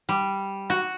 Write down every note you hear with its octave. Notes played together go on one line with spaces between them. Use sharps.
G3
F#4